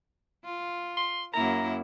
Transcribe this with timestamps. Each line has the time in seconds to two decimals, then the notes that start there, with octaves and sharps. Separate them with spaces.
0.45 F4
0.97 C6
1.34 F#2 A#3 E4 A#5